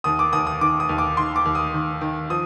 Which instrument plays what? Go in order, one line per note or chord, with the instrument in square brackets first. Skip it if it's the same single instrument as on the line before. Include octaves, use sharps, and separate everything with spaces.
[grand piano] D#2 D#6
D6
D#2 D#6
D#6
D#3 D6
D#6
D#2
D6
D#3 C6
D6
D#2
D#6
D#3
D#3
F3 D#6